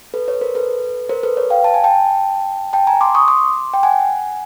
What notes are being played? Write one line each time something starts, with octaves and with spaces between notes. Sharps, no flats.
A4 B4
B4 C#5
A#4 C5
A4 B4
A#4 C5
A4 B4
B4 C#5
F5 G5
A5
G#5
G5 A5
G5 A5
G#5 A#5
C6 D6
C#6 D#6
C6 D6
G5
F#5 G#5